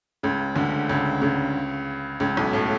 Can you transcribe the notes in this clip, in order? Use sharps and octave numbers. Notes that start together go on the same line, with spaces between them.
C#2 C#3
D2 D3
C#2 C#3
C#2 C#3
C#2 C#3
B1 B2
A2